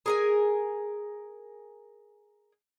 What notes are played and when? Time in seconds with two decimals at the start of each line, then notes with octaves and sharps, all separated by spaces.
0.06 G#4 A#4 G#5